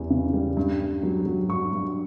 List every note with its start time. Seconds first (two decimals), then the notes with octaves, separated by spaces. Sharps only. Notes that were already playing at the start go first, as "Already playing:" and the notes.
Already playing: E2 C#3 E3 G3
0.10 C#3
0.33 G3
0.57 G2
0.80 G2
1.03 F#3
1.26 F#3
1.49 G2 C#6
1.73 G2